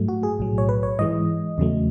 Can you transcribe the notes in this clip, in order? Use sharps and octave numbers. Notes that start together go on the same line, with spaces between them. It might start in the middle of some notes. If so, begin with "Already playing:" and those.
Already playing: G#2 F#3 A3
F#4
G#4
B1 A2 F#3
C#5
B4
C#5
G#2 E3 G#3 D#5
E2 C#3 F#3 A3